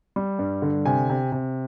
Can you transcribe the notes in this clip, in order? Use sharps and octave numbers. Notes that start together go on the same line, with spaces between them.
G3
G2
D3
C3 G#5
C3
C3